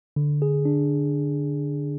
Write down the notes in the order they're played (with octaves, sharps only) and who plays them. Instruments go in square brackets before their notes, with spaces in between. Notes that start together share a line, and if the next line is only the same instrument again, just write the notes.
[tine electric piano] D3
G#4
D4